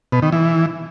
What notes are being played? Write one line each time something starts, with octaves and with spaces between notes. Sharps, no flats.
B2
D#3
E3